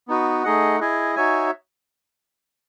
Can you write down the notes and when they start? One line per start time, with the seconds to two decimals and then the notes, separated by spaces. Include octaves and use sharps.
0.08 B3 D#4 F#4 B4
0.44 A3 D#4 G#4 D#5 F#5
0.80 E4 G#4 D#5 G#5
1.16 D#4 F#4 C#5 E5 G#5